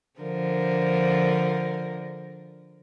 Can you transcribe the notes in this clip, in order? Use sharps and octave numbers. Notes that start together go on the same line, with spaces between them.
D3 F3 A#4